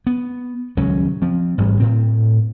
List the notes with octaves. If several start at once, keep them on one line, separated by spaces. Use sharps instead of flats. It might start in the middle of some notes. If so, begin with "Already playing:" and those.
B3
D#1 C#2 F#3 C#4
F3 C4
A1 G#2 G3
A2 C4